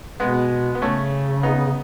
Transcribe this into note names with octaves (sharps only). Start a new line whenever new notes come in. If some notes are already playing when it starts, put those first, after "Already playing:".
B2 G#3 B3
B3
C#3 A3 C#4
B3 D#4